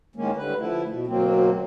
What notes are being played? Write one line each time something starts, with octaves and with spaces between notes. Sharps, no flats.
A2 D#3 G#3 A#3 C#4
D3 G3 B4
F3 A3 E4
B2
D2 B2 F#3 A#3 C4